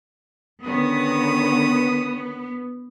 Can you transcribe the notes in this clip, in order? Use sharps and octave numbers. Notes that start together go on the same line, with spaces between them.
D3 D#3 B3 C#4 D#6